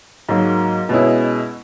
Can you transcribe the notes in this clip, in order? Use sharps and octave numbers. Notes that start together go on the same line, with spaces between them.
G#2 F#3 A#3
B2 G#3 C#4 E4